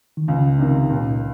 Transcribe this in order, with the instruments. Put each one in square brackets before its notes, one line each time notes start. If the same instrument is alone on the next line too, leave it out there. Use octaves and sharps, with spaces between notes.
[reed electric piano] D#3
[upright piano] C#2 [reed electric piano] C#3
[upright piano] C3 D#3
[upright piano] C#2 [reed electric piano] A#2